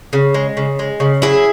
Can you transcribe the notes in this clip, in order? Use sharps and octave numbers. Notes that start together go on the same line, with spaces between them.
C#3
G#3
C#3
G#3
C#3
F#3 E4 G#4